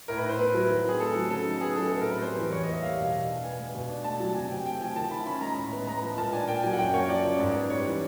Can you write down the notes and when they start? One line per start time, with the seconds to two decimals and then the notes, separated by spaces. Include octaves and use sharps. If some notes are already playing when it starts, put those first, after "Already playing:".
0.08 A2 A#4
0.18 B4
0.24 E4
0.29 C5
0.39 B3 B4
0.54 F#3
0.70 D#3
0.85 C4 G#4
1.00 A3 A4
1.15 F#3
1.30 C#3 A4
1.46 D#4
1.61 B3 G#4
1.76 F#3 A4
1.91 A2 A4
2.01 A#4
2.07 C4 B4
2.22 G3 C5
2.37 E3
2.52 E2 C#5
2.63 D#5
2.67 A#3
2.73 E5
2.83 G3 F5
2.98 B2
3.13 B2
3.28 D4
3.44 B3 G#5
3.59 G#3
3.75 B2
3.89 D4
4.04 A3 A5
4.20 F#3
4.35 C3 G#5
4.50 C3 G5
4.65 A3 G5
4.80 F3 G#5
4.96 D#3 A5
5.11 E4 B5
5.26 C#4 B5
5.41 G#3 A#5
5.56 A2 B5
5.72 B3
5.87 G#3 A#5
6.02 F3
6.18 A#2 A5
6.33 D4 G#5
6.48 A#3 G5
6.63 F#3 G#5
6.73 F#5
6.79 F#2 G5
6.93 A#3 C#5
7.09 F3 D5
7.25 C#3
7.40 G#2
7.55 B3
7.70 G3 C#5
7.86 E3